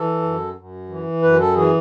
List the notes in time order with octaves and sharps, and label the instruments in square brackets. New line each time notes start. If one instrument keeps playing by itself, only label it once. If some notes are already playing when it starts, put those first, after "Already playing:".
Already playing: [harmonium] E3 A4
F#2
F#2
E3
F#2 B4
A4
E3 G#4